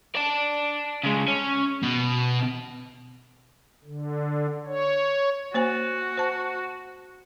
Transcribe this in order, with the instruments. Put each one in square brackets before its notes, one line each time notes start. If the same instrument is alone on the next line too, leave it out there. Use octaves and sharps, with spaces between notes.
[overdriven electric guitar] D5 A5
C#3 G#3
C#4
[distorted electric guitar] B2
[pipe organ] D3
C#5
[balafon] A#3 C5 G#5 [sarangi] F#4
[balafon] C5 A5